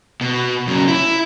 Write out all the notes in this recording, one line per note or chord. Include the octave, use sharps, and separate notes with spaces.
B2
F#2 C#3
E4